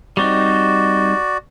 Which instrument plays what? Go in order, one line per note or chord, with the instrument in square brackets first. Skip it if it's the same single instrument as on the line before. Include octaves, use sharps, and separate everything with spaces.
[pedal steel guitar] G3 C4 D#4 [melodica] F#4 D5